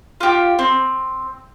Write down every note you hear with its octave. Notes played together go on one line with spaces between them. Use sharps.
F4 G4
C4